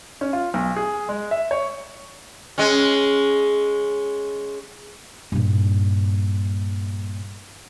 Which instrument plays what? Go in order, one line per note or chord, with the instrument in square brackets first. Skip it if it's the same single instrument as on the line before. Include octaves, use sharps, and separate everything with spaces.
[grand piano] C#4
F4
B1
G#4
G#3
E5
C#5
[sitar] G#3 C#4
[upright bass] G2 A#2